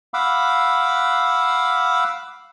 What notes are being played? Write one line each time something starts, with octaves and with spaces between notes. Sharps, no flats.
F5 F#5 B5 D6 E6